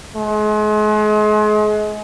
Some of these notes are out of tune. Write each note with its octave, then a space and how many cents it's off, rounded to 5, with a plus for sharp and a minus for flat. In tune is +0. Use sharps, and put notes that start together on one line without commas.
G#3 +35